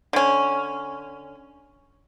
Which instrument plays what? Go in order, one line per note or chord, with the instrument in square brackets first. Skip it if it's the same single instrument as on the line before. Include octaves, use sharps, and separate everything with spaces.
[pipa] D3 C#4